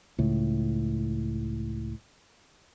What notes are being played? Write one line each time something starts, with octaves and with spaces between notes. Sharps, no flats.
C#2 A2